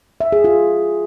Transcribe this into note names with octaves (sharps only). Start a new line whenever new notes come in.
E5
G#4
F4